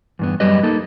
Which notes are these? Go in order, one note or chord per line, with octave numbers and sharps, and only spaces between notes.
E2 G2 B3
G2 F#3 G3 G4 B4 D#5
A#3 D#4 A4